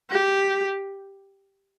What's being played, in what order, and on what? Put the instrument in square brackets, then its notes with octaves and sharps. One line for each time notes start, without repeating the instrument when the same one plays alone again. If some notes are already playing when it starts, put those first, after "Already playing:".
[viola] G4